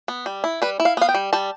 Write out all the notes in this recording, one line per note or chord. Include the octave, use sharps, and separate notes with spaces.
B3
G3
E4
G3 B4
E4
F5
B3 F5
G5
G3
G3 A5